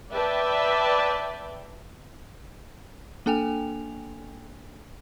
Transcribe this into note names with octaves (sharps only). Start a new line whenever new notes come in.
B4 D5 E5 G5 A5
A#3 D4 A4 G5 G#5 F7